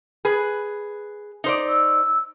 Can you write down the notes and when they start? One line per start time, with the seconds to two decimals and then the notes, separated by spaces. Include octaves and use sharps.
0.25 G#4 B4
1.44 D#4 C5 D5
1.68 E6